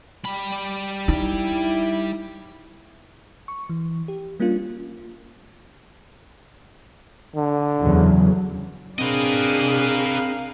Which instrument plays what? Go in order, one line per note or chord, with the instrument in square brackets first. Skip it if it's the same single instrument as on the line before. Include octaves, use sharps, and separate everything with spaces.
[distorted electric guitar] G3 B5
[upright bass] D#4 [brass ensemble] E4
[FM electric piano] C#6
E3
G4
G3 A#3 C#4 D4 F4
[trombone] D3
[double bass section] E2 C#3 F#3
[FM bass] C4 [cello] D4 G#4 [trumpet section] A#4 F5 [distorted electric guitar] B4 D#5